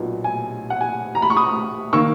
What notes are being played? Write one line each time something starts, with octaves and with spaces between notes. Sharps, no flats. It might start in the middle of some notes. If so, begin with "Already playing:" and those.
Already playing: B1 A#2 F#3 B3
G#5
F#5
G#5
A#5
B5
C#6
B5 D#6
D#3 A#3 C#6 E6